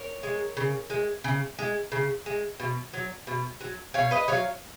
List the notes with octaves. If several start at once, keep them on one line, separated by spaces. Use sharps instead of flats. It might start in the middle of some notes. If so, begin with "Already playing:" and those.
Already playing: A#4 C#5
G#3
C#3
G#3
C#3
G#3
C#3
G#3
B2
F#3
B2
F#3
B2 C#5 F5
B4 D#5
F#3 C#5 F5